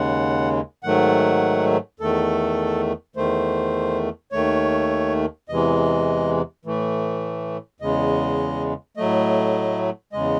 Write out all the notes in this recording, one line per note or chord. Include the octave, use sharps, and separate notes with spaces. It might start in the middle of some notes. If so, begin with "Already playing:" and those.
Already playing: D#2 C#3 G#3 F#5
G#2 D#3 F#3 A3 F#5
E2 D#3 A3 A4
E2 D#3 A3 C5
D#2 D#3 A3 C#5
E2 C3 E3 G#3 D#5
A2 E3 A3
E2 C#3 G#3 D#5
A2 F#3 A3 D#5
E2 C#3 G#3 D#5